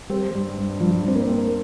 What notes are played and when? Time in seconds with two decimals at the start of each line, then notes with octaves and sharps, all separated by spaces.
0.10 G3 C4
0.34 G2
0.57 G2
0.80 G2 F3
1.03 G2 C4
1.16 A#3
1.27 C4